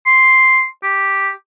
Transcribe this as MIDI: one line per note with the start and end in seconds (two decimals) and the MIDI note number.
0.06 0.65 84
0.83 1.30 67